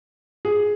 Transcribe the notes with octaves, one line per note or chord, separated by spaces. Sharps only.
G#4